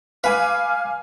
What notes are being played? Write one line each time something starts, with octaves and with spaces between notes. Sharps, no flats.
B4 F5 G#5 D6 F6